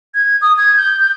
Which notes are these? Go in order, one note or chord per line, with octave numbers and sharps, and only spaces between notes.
G#6
D#6
G#6
G6
G6